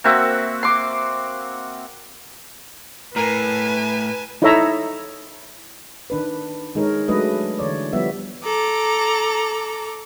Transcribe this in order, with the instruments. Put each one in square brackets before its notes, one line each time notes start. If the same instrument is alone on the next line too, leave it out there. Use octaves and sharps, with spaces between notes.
[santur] A#3 C4 F#4 E5
C6 D6
[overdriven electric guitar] A2 [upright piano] A#4 [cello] B4 [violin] G#5 A5
[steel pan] D#4 E4 A4 C#5 E5 A#5
[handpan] D#3 D4 B4
D#3 G#3 D#4 A#4 C#5
F#3 G#3 A3 D4 B4 D#5
D3 E3 C#5 D5
F3 G3 B3 E5
[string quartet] A4 A#5 D6